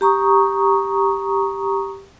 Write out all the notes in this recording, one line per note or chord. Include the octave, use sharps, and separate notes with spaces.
G4 A#5 C#6 D#6